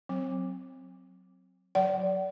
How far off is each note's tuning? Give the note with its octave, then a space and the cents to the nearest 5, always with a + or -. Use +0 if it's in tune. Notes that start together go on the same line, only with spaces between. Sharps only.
F#3 +0 C4 +0
F#3 +0 D5 -25 F#5 +35